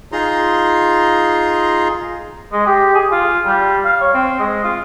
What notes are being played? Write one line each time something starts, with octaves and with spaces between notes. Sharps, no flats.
D#4 F4 G#4 A#5 C6
G#3
G4
G#4
F4
G3
F5
C#5
C4
G#3
F4